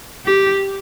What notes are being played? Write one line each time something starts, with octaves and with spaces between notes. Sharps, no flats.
G4